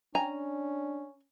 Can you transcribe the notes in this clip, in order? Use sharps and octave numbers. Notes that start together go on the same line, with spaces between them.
C#4 D4 G#5 A#5